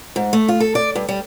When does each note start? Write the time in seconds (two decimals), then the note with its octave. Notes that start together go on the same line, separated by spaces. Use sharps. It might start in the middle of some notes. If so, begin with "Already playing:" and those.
0.16 G#2
0.33 A3
0.48 F4
0.60 A4
0.75 D5
0.95 G2
1.09 G3